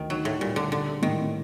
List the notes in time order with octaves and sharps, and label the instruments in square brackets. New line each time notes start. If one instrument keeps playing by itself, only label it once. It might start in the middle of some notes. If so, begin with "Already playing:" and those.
Already playing: [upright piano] D2 [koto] D#3
[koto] F#3 [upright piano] D#4
[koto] A2
[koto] A#2 [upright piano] G3
[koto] D3
[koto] D3 [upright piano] D4
[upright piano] A2 [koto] D#3